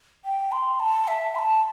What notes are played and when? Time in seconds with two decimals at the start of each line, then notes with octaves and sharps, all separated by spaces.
0.25 G5
0.52 C6
0.80 A5
1.08 E5
1.35 C6
1.38 A5